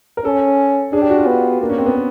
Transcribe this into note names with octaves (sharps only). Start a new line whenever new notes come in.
A#4
C#4 A4
D4 G#4
G4
F#4
F4
B3
A#3 D4
C#4
C4
B3
C4